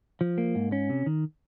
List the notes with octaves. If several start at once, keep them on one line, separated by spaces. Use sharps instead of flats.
F3
A#3
G#2
C#4
C3
D#3